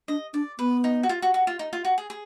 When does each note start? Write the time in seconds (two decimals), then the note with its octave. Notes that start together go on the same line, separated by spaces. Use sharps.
0.08 D4 D#5
0.34 D4 D5
0.59 B3 B4
0.84 D#4
1.03 F#4
1.09 F4
1.22 F#4
1.34 F#4
1.47 F4
1.59 D#4
1.73 F4
1.84 F#4
1.98 G#4
2.10 G#4